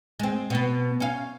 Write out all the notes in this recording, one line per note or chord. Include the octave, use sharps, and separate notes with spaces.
G#3 C4
B2 B3
C#4 F5